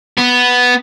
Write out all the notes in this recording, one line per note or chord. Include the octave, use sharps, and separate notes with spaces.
B3